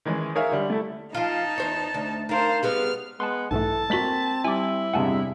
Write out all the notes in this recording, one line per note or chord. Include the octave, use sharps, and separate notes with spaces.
D#3 E3 G#3 C#4
D#4 G#4 A#4 C#5 E5 F5
D3 G3
A3 E4 A4
F3 D#4 F4 A5
E2 C5 C#5
D2
D#4 A#4 C5 F5 A5
G3 G#3 B3 F6
G#3 B3 A5 C6
B1 G#2 E3 A3 A4 A5
G#3 A#3 C4 F#4 B6 F#7
G3 E4 G#5 D6
E2 G2 C3 G#3 F#5 G#5 A5